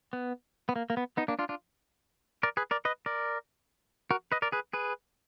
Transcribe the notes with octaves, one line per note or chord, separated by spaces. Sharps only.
B3
B3
A#3
A#3
B3
B3 D#4
A#3 D4
D4 F4
D4 F4
A#4 D5
G#4 B4
A#4 D5
B4 D#5
A#4 D5
F#4 A#4
B4 D#5
A#4 D5
G#4 B4
G#4 B4